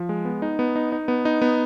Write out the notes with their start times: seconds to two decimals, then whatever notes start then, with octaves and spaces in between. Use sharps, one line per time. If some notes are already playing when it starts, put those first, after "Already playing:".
Already playing: F3
0.09 G#3
0.25 B3
0.42 D#4
0.59 B3
0.76 D#4
0.92 D#4
1.08 B3
1.25 D#4
1.42 B3